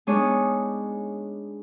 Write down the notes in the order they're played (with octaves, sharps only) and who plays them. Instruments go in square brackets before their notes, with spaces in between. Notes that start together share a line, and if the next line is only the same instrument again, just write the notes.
[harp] G#3 B3 D4 D#4 C#5 D#6